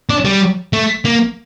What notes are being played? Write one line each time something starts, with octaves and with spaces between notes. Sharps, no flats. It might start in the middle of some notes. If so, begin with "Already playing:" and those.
D4
G3
A3
A#3